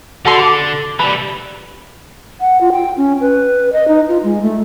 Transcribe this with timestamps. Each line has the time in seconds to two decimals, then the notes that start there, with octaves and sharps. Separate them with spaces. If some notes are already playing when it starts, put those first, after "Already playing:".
0.25 D3 F#4 A4 C6
0.39 D6
0.99 E3 G3 B5
2.41 F#5
2.61 F4
2.72 G5
2.97 C#4
3.21 B4
3.73 D#5
3.88 D#4
4.09 F4
4.23 G#3
4.42 A3